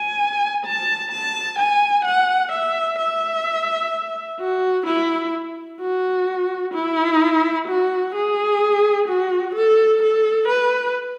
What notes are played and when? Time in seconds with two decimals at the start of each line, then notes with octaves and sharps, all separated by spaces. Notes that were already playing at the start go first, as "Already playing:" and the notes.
Already playing: G#5
0.65 A5
1.11 A5
1.59 G#5
2.05 F#5
2.52 E5
2.99 E5
4.40 F#4
4.86 E4
5.81 F#4
6.74 E4
7.68 F#4
8.15 G#4
9.08 F#4
9.55 A4
10.03 A4
10.49 B4